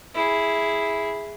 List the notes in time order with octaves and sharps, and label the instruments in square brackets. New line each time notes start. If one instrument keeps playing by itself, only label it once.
[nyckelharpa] E4 G#4